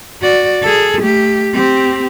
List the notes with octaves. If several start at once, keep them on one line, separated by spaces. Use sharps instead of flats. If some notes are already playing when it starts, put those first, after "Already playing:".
F#4 D5
G#4 A4
A3 G4
C4 G4